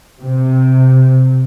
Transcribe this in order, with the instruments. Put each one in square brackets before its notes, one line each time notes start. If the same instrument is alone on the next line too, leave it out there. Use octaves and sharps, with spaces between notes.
[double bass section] C3